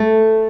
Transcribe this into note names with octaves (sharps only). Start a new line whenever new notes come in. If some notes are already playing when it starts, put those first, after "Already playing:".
Already playing: A3